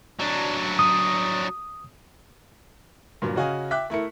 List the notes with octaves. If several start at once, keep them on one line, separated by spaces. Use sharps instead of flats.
F#3 D4
D#6
G2 A#2 F#3 A#4
C#3 C#4 F#4 D#5 F5 G#5
E5 G5 D6 F#6 B6
A3 E4 A#4 C#7